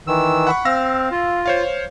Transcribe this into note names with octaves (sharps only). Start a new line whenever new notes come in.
D#3 E3 E6
F#5 B5 C#6
C4 F5 E6 A#6
F4
C5 C#5 F5